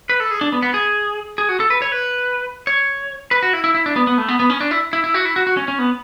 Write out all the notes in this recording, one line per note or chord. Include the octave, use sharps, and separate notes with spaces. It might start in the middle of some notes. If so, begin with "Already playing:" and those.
B4
A4
G#4
D4
B3
B3
G#4
G#4
F#4
A4
B4
C#5
B4
C#5
B4
F#4
E4
E4
E4
D4
B3
B3
A3
B3
B3
C#4
D4
E4
E4
E4
F#4
E4
F#4
F#4
C#4
C#4
B3